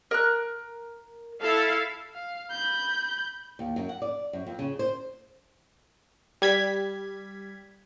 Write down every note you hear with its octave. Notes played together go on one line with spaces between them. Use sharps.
A#4 F#6
E4 A4 F5
F5
B5 G6
D#2
F#2
F#5
D5
F#2
F2
C#3
C5
G3 G#6 B6